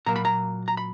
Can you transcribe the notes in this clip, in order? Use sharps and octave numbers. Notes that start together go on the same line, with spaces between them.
A#2 F#3 A#3 A#5
B5
A#5
A#5
B5